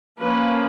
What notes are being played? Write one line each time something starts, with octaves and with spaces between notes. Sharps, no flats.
F3 A#3 C#4 B4